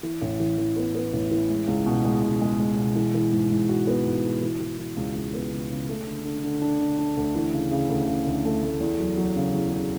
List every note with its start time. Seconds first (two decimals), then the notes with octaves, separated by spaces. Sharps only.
0.03 E3
0.21 A1
0.40 E3
0.58 E3
0.76 B3
0.95 B3
1.13 A1
1.31 E3
1.50 G#3
1.68 C#2
1.86 B2
2.05 G#3
2.23 B2
2.41 G#3
2.59 G#3
2.77 B2
2.95 E3
3.14 E3
3.32 G#2
3.51 G#2
3.69 F#4
3.87 B3
4.06 G#2
4.24 F#4
4.42 E3
4.60 E3
4.78 E3
4.97 C#2
5.16 C#2
5.33 B3
5.52 C#3
5.70 C#3
5.89 A3
6.07 D3
6.25 D3
6.44 D3
6.62 D4
6.79 D3
6.98 D4
7.17 D2
7.35 E3
7.53 C#3
7.71 C#3
7.89 D2
8.08 C#3
8.26 D2
8.45 A3
8.63 A3
8.81 E2
8.99 F#3
9.17 F#3
9.36 C#3
9.55 E2
9.73 C#3